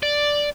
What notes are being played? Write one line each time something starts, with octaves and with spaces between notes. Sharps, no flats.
D5